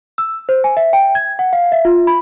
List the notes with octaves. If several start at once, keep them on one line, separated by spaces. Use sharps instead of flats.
E6
C5
G#5
E5
G5
G#6
F#5
F5
E5
F4
B5